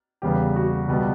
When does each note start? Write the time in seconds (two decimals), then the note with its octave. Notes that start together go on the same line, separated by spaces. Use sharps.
0.22 E2 C#3 G3 B3 G4
0.56 F#4
0.88 C#2 B2 G3 B3